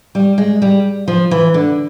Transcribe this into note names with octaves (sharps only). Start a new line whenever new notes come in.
G3
G#3
G3
F3
E3
D3